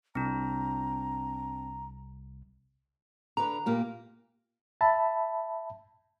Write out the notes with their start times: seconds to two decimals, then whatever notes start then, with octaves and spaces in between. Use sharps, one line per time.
0.15 C2 C4 D4 A#5
3.37 D3 B4 A#5
3.66 A#2 A#3 G4
4.81 E5 A5 B5